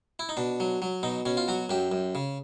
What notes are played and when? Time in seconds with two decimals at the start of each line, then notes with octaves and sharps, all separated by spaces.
0.19 E4
0.29 D#4
0.37 B2 D4
0.60 F#3
0.82 F#3
1.03 B2 D#4
1.25 B2 C#4
1.37 F4
1.48 F#3 F#4
1.69 F#2 G4
1.92 F#2
2.15 C#3